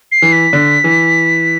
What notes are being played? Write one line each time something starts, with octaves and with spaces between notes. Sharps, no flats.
C7
E3
B6
D3
E3